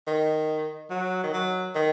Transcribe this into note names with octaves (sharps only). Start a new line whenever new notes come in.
D#3
F#3
D#3
F#3
D#3